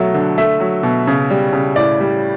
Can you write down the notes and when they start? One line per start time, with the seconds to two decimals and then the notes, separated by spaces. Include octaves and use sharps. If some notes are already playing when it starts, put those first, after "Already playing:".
Already playing: B2 F#3 A3
0.14 D3
0.38 A3 E5
0.60 F#3
0.83 B2
1.07 C#3
1.30 G3
1.53 C#3
1.76 A2 D5
2.00 G3